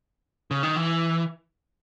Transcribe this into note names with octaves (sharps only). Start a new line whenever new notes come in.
C#3
D#3
E3